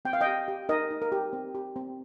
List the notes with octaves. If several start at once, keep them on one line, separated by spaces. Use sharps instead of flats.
C4 G5
F5
D#5 G5
G4
G4
D#4 A#4 D#5
D#4
A#4
G4
C4
G4
C4